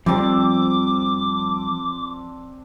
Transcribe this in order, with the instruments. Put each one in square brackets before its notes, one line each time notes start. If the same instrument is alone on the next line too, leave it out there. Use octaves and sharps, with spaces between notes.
[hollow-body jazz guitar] F2 G3 [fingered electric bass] F3 [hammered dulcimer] C4 D4 [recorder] D6